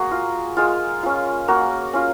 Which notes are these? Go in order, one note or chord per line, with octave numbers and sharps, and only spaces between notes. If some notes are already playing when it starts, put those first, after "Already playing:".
Already playing: A#3 F#4 G#4
F4
G#3 F4
C#4 F4
A#3 F#4
C#4 F4